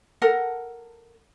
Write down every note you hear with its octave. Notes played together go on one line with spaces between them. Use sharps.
A4 A#4 F#5